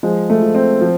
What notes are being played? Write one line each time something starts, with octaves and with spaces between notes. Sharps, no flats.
F3 G#3
A3
F3
C4
F3